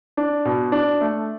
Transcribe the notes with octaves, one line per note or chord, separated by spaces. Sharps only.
D4
B2
D4
A3